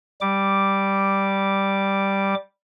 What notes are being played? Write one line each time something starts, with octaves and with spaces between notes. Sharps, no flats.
G3 D6